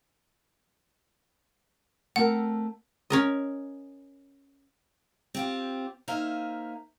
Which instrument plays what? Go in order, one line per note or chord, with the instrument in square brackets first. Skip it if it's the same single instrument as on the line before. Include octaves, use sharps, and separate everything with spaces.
[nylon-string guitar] A3 C4 A#4 [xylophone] F#5
[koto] C#4 A#4 D#5
[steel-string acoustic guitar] C4 F4 G4
A#3 D#4 C5 E5 F5